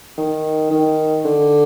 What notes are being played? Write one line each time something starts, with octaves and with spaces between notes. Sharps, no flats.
D#3
D#3
D3